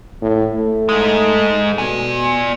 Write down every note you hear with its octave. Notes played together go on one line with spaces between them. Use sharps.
A2
A3
G#2 G#3
B2 D5 G#5